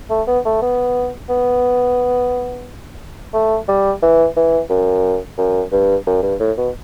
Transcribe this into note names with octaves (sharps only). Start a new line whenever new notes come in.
A3
B3
A3
B3
B3
A3
G3
E3
E3
F#2
F#2
G2
F#2
G2
A2
B2